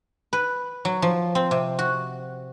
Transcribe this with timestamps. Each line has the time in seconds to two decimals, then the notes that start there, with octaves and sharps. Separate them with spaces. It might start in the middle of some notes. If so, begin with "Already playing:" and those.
0.33 B4
0.85 F#3
1.02 F3
1.35 C4
1.51 C3
1.79 F#4